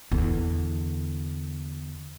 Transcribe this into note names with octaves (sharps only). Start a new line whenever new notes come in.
E2 D3